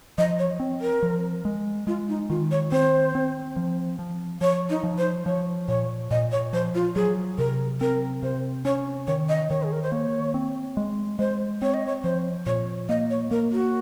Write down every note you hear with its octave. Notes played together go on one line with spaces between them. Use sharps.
F3 D#5
C#5
C4
A#4
F3
G#3
G#3 F4
D#4
D#3 F4
C#5
C4 C5
C4
F3
F3
F3 C#5
D#4
F3
C5
F3 C#5
A#2 C#5
A#2 D#5
C#5
F3 C5
F4
F#3 G#4
C3 A#4
C4 A#4
C3 C5
C#4 C#5
D#3 C#5
D#5
D#3 C#5
G#4
A#4
C5
A#3 C#5
C4
G#3
G#3 C5
C4 C#5
D#5
C#5
F3 C5
A#2 C#5
A#3 D#5
C#5
A#3 A#4
F#4